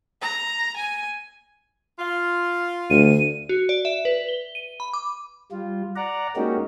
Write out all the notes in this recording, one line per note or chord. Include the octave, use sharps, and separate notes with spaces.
A#5
G#5
F4
D2 D#7
F#4
D5
E5
B4
G7
D#7
B5
D6
G3 F4
D5 F#5 A#5
G#3 A#3 C#4 D#4 F#4 G4